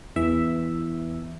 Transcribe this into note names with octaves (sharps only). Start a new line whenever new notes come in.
E2 E3 E5